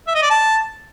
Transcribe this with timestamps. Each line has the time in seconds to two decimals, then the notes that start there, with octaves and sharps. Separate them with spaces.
0.07 E5
0.15 D#5
0.22 D5
0.30 A5